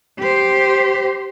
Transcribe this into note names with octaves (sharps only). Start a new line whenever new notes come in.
G4 C5